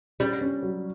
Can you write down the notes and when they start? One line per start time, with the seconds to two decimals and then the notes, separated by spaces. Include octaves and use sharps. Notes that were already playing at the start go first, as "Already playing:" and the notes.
0.20 G3 C#4
0.41 C#4
0.62 F#3